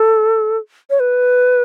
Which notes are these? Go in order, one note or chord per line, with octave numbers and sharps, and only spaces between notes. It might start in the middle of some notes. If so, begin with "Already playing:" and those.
Already playing: A4
C#5
B4